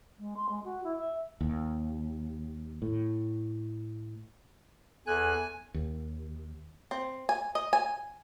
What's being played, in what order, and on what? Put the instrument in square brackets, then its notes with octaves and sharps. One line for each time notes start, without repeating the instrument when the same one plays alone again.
[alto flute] G#3
C6
G#3
F#4
E4
E5
[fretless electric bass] D#2
A2
[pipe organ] E2 F#6 [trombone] A4 [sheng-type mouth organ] G#5
[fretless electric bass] D#2
[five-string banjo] C4
G#5
D#5
G#5